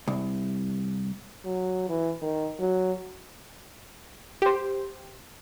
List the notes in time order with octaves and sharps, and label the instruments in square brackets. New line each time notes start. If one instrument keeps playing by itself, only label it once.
[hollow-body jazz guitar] C2
[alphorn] F#3
E3
D#3
F#3
[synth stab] G4 C5